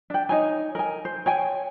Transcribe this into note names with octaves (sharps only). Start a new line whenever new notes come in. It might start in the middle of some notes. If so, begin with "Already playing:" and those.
D4 G5
D#4 C#5 G#5
A#4 G#5
C5
C#5 G5 G#5